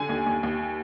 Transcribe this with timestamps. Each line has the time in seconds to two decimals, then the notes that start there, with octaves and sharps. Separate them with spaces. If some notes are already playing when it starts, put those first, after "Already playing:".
Already playing: D3 G#5
0.09 D#2
0.26 D#2
0.43 D#2